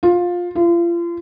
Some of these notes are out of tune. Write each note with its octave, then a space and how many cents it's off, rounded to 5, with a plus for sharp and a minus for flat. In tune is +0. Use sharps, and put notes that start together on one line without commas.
F4 +15
F4 -35